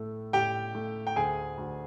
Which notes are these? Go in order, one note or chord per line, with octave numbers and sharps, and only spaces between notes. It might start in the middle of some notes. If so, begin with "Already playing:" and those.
Already playing: A2 A3
A2 G4 G5
A3
G5
D2 G#4 G#5
D2